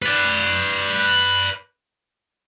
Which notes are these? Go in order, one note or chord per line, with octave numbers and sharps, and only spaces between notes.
B4 D5